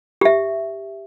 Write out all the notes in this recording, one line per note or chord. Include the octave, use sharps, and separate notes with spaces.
G4 E5